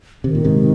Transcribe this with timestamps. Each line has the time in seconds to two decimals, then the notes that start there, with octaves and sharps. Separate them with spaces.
0.24 C3 D#3
0.35 A#2
0.45 G#2 C3